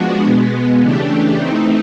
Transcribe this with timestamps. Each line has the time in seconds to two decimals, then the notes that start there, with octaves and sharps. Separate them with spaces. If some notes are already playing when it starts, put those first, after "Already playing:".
Already playing: F3 G#3 B3 D4 F#4
0.25 B2 G#3 B3
0.82 C#3 E3 A3 D4 G4
1.39 E3 A3 C4 D#4